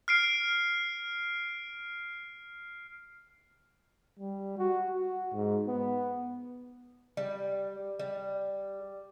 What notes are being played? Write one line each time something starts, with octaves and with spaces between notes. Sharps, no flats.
F6 C7 D7
G3
F#4
F#4
G#2
B3
G3
G3